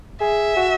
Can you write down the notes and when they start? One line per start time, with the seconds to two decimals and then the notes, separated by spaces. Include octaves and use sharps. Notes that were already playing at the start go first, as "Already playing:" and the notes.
0.21 G#4 E5
0.56 F#4